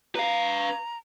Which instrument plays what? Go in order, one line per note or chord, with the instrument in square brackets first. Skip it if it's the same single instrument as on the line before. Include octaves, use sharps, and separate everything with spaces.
[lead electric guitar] B4 F5 [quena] A#5